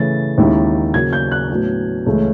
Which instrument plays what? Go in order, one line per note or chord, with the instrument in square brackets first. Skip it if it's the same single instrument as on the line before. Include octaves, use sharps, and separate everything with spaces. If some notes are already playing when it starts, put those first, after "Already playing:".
Already playing: [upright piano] C#3 E3 A3 A6
D#2 D#3 G#3 C#4 E4
C#3 F#3 A#3 G#6
G6
F#6
A2 F#3 B3 D4
C#2 C#3 E3 A3